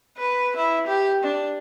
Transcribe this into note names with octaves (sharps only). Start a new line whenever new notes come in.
B4
E4
G4
D4